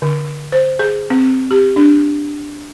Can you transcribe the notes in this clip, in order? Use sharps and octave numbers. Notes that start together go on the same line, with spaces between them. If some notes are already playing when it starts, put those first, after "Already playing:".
D3
C5
G#4
C4
G4
D4